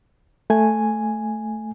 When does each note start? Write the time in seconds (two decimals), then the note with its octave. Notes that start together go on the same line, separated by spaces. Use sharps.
0.50 A3 G#5